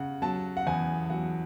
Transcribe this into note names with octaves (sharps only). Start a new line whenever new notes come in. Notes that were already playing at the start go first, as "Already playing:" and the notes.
Already playing: C#3 F#5
F#3 A5
F#5
E2 G#5
F#3 F#5